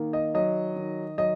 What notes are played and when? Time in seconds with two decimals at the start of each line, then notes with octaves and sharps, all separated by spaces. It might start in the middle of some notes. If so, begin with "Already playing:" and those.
Already playing: D#3 A#3
0.13 D#5
0.34 F#3 D#5
0.76 D#3
1.18 F#3 D#5